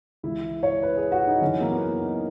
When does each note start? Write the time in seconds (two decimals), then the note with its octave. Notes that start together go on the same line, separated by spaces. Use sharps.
0.23 C#2 C#3 E3 E4
0.63 C#5
0.83 B4
0.97 G#4
1.12 F#4
1.27 D#4
1.41 F#2 C#3 E3 C#4
1.60 A#3
1.71 B3
2.00 D#4